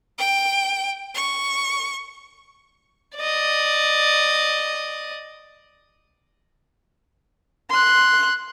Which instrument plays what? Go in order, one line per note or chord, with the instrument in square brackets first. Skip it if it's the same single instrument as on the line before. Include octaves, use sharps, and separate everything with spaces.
[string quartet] G5
C#6
[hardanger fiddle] D5 D#5
[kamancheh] C6 F#6